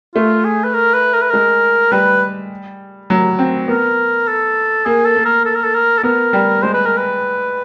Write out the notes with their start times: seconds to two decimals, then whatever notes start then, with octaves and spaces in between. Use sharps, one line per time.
0.15 A3 F4
0.44 G#4
0.64 B4
0.74 A#4
0.94 B4
1.13 A#4
1.22 B4
1.30 G#3 A#4
1.92 G3 B4
3.10 F#3
3.39 C4
3.68 B3 A#4
4.27 A4
4.86 A#3 G#4
5.05 A4
5.16 A#3
5.25 A#4
5.45 A4
5.55 A#4
5.64 A4
5.74 A#4
5.98 A4
6.03 B3 A#4
6.33 G3
6.63 G#3 C5
6.74 B4
6.86 A#4
6.97 B4